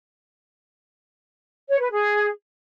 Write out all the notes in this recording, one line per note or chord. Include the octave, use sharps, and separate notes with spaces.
C#5
B4
G#4